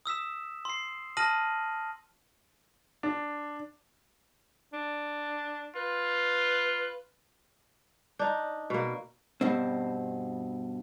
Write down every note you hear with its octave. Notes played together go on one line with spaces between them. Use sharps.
D#6 E6 B6 E7
C6 C7
A5 D#6 F6 A#6 D#7 F#7
D4
D4
F4 B4
D4 D#4
B2 A#3
G2 B2 C4